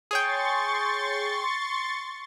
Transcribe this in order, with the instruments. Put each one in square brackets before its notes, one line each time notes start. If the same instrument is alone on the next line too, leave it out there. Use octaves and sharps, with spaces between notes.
[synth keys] G#4 C#5 G5 [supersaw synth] C6 C#6 A6